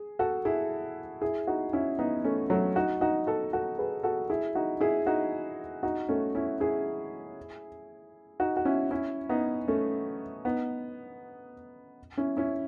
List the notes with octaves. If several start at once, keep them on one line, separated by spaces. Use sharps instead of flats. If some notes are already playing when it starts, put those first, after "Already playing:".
Already playing: G#4
F#4 A4
E4 G#4
E4 G#4
D#4 F#4
C#4 E4
B3 D#4
A3 C#4
F#3 A3
D#4 F#4
D#4 F#4
F#4 A4
F#4 A4
G#4 B4
F#4 A4
E4 G#4
D#4 F#4
E4 G#4
D#4 F#4
D#4 F#4
A3 C#4
C#4 E4
E4 G#4
D#4 F#4
F#4
C#4 E4
C#4 E4
B3 D#4
A3 C#4
B3 D#4
C#4 E4
C#4 E4